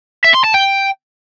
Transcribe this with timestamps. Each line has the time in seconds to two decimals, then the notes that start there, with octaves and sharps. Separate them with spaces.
0.24 E5
0.34 C6
0.44 A5
0.54 G5